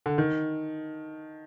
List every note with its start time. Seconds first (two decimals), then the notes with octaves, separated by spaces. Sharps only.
0.06 D3
0.18 D#3